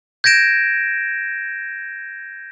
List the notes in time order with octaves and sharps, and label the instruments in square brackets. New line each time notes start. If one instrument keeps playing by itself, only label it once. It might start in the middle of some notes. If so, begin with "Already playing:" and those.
[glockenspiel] G6 G#6 A#6 D7 E7